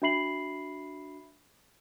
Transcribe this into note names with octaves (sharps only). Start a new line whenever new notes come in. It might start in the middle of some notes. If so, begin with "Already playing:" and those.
D4 F#4 E5 B5 C7 F#7